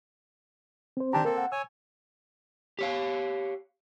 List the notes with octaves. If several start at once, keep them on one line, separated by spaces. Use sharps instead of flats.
C4 C5
D#3 C4 D4 G4 A5 A#5
A#3 C4 A4 A#4
F#5
C#5 G#5 E6
G4 C#5 F5